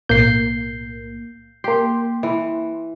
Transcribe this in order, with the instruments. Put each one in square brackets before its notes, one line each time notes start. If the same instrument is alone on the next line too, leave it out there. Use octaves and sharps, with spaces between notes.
[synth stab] B1 A2 A#3 [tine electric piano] G6 C7
[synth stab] A#3 C6 [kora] G4
[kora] E3